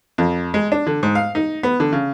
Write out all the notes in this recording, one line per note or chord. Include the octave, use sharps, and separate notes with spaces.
F2
G#3
D4
D3
G#2
F5
D#4
B3
D3
C#3